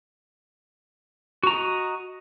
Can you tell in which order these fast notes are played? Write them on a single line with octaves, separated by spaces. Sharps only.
F#4 A#5 D#5